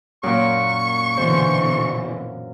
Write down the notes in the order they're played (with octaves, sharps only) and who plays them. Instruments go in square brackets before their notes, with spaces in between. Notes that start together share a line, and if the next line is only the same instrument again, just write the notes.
[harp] F#2 A#2 [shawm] C#6
[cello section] B2 D3 E3 [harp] C5